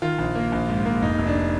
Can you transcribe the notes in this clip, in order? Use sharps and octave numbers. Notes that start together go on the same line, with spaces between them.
D#3 F4
A#1
A#3
A#1
G#2
A#3
F1 D#4
F1
D4